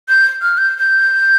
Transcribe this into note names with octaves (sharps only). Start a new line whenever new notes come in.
G6
F6
G6
G6